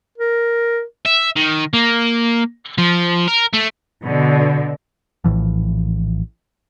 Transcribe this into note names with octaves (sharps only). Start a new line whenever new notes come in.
A#4
E5
D#3
A#3
F3
A#4
A3
B2 D3
A#1 A2 E3 F3